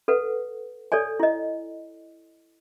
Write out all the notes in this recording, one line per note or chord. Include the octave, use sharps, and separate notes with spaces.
A4 B4 F#5
A4 C#5 D5 G#5
E4 D#5